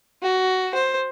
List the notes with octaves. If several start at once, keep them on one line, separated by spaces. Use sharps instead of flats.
F#4
C5